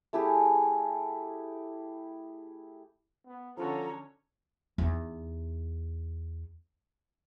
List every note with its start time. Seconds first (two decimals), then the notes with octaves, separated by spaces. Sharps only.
0.13 A3 E4 G4 G#4
3.27 B3
3.57 D3 F3 C#4 F4 F#4 A4 C#5 A#5
4.78 E2 D#4